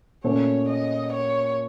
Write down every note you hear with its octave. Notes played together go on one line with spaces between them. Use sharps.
A#2 A3 C#4 C#5
D#5
C#5